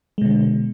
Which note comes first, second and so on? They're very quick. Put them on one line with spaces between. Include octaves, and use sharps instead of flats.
G#3 B2 D3